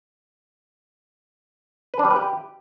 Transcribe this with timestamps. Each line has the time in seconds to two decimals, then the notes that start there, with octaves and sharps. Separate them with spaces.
1.94 B4
1.99 D4
2.05 G3
2.10 B4
2.16 G4